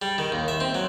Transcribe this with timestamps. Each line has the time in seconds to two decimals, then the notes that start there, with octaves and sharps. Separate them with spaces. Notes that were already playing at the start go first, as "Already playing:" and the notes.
0.02 G3
0.18 D#3
0.32 D#2
0.48 E5
0.60 C4
0.75 F#3